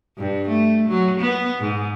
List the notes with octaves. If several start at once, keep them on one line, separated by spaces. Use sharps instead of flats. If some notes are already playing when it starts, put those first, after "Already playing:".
G2
A3
F#3
B3
G#2